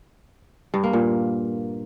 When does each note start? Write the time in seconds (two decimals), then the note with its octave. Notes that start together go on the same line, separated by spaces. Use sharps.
0.74 G2
0.83 A#3
0.93 A#2